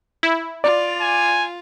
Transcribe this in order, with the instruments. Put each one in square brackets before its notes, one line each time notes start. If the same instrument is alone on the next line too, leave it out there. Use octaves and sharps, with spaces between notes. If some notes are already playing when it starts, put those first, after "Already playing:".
[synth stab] E4
[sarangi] F4 [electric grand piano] D5
[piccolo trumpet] G#5